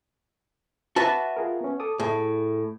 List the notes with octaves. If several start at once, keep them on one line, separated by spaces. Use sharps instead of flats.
F#4 B4 E5 A5
F4 G#4 A#4
B3 C#4
A4 D6 D#6
A2 E4 G#4